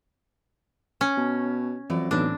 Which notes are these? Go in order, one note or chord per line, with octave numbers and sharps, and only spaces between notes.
C#4
B2
F2 E3 F#3 D5
B1 A2 E3 C4 D4